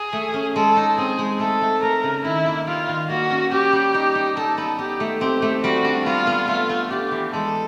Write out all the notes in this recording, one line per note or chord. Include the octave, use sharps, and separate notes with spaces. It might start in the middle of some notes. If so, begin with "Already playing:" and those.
Already playing: G#4
A3
C#4
G#3 A4
D#4
C4 G#4
G#3
A3 A4
A3
A3 A#4
C#3
D#3 E4
A#3
G3 F4
D#3
A#3 F#4
C#4
C#4 G4
G3
D#4
D#4
D#4 A4
B3
D#4 G4
A3
C4 G4
A3
G3 F#4
D4
B3 F4
B3
A3 F4
A3
D4 G4
E3
G#3 A4